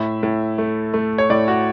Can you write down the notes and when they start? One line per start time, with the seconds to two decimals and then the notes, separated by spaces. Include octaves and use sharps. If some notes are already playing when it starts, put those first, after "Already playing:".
Already playing: A2 E5
0.23 A2
0.58 A3
0.94 A3
1.18 C#5
1.30 A2 D5
1.48 F#4